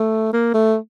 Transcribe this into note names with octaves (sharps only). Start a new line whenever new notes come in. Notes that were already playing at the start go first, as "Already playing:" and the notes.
Already playing: A3
A#3
A3